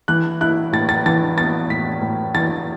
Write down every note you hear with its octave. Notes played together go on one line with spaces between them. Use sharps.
E3 F#6
E4 F#6
A2 A6
A6
E3 A6
B3 A6
A2 B6
A2
E3 A6